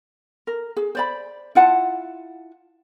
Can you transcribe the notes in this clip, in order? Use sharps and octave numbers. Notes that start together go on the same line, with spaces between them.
A#4
G#4
C5 D5 B5
E4 F4 F#5 A5